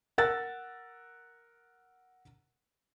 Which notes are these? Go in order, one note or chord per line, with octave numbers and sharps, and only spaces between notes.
A#4 F#5 E6 F#6 A6